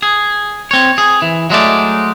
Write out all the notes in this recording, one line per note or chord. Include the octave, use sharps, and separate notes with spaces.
G#4
C4 C#5
G#4
E3
F#3 G#3 A3 D5